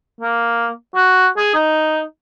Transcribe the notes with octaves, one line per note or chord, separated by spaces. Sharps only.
A#3
F#4
G#4
D#4